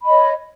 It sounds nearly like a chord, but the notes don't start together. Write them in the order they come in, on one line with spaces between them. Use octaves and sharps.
B5 D#5 C#5